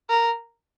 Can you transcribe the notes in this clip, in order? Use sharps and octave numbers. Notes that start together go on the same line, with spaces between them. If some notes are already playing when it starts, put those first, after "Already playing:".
A#4